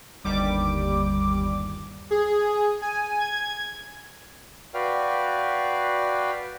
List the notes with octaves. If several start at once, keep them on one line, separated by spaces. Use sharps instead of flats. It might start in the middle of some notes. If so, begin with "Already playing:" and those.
G1 D#2 G3 D6
G#4
G#5
G#6
F#4 B4 D5 F5 G5 F6